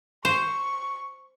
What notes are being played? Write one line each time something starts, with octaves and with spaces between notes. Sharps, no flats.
C5 C#6